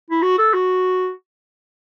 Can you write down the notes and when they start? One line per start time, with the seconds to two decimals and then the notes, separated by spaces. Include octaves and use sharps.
0.10 E4
0.22 F#4
0.38 A4
0.54 F#4